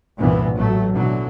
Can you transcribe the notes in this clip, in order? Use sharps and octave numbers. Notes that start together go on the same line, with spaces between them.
C2 G2 A#2 E3 B3
A1 F#3 A3
B2 D3 E3 F#3